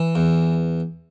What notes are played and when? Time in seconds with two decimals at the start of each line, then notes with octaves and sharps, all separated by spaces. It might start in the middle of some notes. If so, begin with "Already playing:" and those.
Already playing: E3
0.15 E2